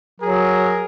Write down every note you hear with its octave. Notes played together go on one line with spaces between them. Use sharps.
F#3 G#4 A#4